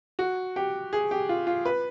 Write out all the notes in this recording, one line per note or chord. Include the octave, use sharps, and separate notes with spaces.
F#4
G4
G#4
G4
F4
F4
B4